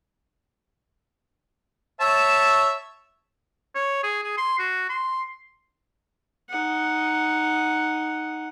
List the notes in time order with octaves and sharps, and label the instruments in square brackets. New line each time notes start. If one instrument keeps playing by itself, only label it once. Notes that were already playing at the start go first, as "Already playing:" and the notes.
[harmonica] C#5 E5 A5
[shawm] C#5
G#4
G#4
C6
F#4
C6
[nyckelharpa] D#4 F#5